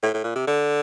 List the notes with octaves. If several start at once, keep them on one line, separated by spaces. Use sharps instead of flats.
A2
A2
A#2
C3
D3